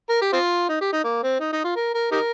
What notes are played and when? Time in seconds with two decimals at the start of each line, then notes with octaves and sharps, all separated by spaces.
0.09 A#4
0.21 G4
0.33 C4 F4
0.69 D#4
0.81 G4
0.92 D#4
1.04 A#3
1.23 C4
1.40 D#4
1.52 D#4
1.64 F4
1.76 A#4
1.94 A#4
2.12 D#4 G4 A#4